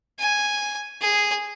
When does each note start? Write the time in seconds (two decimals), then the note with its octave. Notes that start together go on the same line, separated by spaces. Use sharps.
0.19 G#5
1.01 G#4